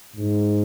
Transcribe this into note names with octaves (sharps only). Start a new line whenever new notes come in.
G#2